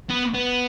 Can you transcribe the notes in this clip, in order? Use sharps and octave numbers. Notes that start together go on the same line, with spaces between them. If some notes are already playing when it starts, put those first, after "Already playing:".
B3
B3